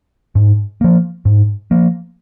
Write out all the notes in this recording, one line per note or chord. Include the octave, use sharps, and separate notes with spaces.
G#2
F3 A#3
G#2
F3 A#3